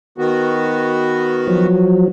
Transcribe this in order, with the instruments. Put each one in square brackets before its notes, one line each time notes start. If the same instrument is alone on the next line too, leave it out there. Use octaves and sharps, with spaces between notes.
[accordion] D#3 B3 F#4
[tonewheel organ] F3 F#3